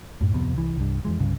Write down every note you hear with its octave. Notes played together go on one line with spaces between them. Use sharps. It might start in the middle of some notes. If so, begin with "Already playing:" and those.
F#2 A2
D1 F2 C3 B3
C2 E3
C2 G2
F2 E3 G#3
C2 G2 C#3